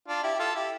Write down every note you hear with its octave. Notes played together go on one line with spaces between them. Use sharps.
D4 F4
E4 G4
G4
F4 A4
E4 G4